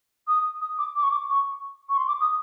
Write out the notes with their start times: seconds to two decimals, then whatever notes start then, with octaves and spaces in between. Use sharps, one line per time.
0.27 D#6
0.61 D#6
0.78 D6
0.95 D6
1.03 C#6
1.10 D6
1.29 C#6
1.89 C#6
1.97 C6
2.07 D6
2.20 D#6